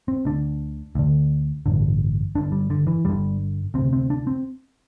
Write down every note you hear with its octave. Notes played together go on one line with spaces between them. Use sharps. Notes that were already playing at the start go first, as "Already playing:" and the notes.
C4
D2 D3 D4
D2 D3
A1 G2 D3
G1 G2 D3 D4
G3
D3
E3
G1 G2 D3 G3
D2 C3 C4
C4
D4
C4